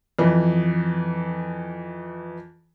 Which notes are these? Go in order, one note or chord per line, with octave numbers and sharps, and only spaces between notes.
F2 E3